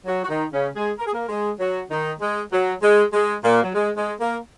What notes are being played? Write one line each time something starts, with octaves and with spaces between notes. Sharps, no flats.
F#3 F#4
F#4
D#3 D#4
C#3 C#4
G#3 G#4
A#4
G#4
A#3 A#4
G#3 G#4
F#3 F#4
D#3 D#4
G#3
F#3
G#3
G#3
A#2 A#3
F#3
G#3
G#3
A#3 A#4